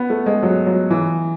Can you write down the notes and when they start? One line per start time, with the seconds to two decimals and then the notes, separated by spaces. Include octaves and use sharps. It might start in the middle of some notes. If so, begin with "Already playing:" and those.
Already playing: B3
0.10 A3
0.26 G#3
0.43 F#3
0.67 F#3
0.90 E3